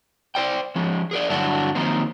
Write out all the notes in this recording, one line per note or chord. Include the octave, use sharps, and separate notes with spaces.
C5 D5 G5
F3 G#3 C#4
G#4 A#4 D5
G2 D3 F#3 D4 E4 F#4
D#3 F3 F#3 A#3 C4